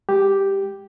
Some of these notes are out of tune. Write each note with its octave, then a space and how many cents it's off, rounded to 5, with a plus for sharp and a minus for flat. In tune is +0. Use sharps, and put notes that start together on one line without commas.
G#3 -20 G4 +0